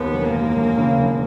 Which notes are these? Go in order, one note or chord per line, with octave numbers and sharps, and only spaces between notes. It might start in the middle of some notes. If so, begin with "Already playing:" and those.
Already playing: D#2 B3
E1
A#3
D#2
E1
C#3
E1